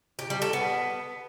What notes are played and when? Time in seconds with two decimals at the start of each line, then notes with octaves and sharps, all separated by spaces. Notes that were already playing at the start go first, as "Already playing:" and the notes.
0.19 G4
0.30 G3
0.42 A4
0.53 B3